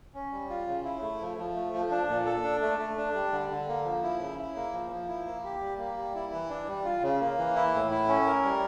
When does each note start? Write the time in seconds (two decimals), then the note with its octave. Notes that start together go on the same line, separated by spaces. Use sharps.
0.14 C#4
0.32 G3
0.50 F4
0.67 C#3
0.84 E4
1.02 A3
1.20 F3
1.37 F3
1.55 A3
1.73 F3
1.91 D4
2.09 A#2
2.26 A4
2.43 D4
2.62 A3
2.79 A3
2.97 D4
3.14 G3
3.32 D3
3.50 D3
3.68 A#3
3.85 F3
4.03 E4
4.20 C#3
4.38 E4
4.56 A#3
4.73 F3
4.91 F3
5.08 E4
5.26 A#3
5.44 G4
5.61 G3
5.79 A#3
5.97 G3
6.15 E4
6.33 E3
6.50 D4
6.68 G3
6.85 F4
7.02 C#3
7.20 A#3
7.38 E3
7.56 E4
7.74 A2
7.91 E4
8.08 C#4
8.26 A#4
8.45 G3